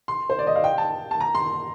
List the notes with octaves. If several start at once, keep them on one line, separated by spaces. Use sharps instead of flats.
C6
C5
D5
D#5
F5
G5
A5
A5
A#5
C6